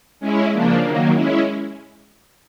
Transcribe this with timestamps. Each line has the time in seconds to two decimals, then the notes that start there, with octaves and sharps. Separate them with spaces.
0.20 G#3 C#4 E4
0.51 C#3 F3 A#3 D4
0.82 D#3 F#3 A#3
1.13 G#3 C#4 E4